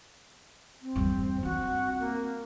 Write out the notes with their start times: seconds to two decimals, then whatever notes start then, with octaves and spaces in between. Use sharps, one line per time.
0.81 C4
0.96 E2 G2
1.43 C4 D4 F#4
1.99 A#3